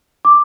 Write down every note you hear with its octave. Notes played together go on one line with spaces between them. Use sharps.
D6